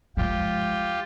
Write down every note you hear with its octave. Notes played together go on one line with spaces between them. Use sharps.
F3 G#3 F4 G4